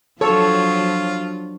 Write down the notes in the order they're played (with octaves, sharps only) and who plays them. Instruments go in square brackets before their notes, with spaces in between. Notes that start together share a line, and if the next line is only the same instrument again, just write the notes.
[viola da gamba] F3 F#3 D4 [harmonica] F4 [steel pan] A4 [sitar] C#5